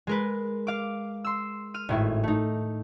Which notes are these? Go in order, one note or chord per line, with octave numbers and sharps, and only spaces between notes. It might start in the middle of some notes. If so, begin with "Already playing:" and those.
G#3 A#4 B4
F5 D6
C6 E6
F6 D#7
G#1 A2 E4
A3 D#4